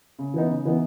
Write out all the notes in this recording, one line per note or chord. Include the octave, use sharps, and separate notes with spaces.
C#3
E3 B3 D#4
C#3
E3 B3 D#4